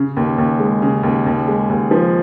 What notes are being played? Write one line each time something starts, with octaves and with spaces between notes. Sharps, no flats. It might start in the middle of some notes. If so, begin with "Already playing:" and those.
Already playing: C#3
D#2
D#2
G#3
C#3
D#2
D#2
G#3
D#2
F3